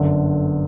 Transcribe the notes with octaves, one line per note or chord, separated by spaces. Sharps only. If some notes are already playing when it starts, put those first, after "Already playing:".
Already playing: G1 F#2 D3